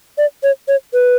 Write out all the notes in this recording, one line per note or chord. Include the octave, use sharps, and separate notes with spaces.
D5
C#5
C#5
B4